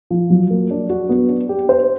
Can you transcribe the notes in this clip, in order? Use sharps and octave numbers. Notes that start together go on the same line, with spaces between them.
F3
F#3
A#3
D4
F#4
B3
D4
G4
C5